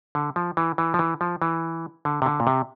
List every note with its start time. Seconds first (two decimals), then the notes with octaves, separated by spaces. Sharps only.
0.15 D3
0.36 F3
0.57 E3
0.78 E3
0.94 F3
0.99 E3
1.21 F3
1.42 E3
2.05 D3
2.22 C3
2.26 D3
2.40 A#2
2.47 C3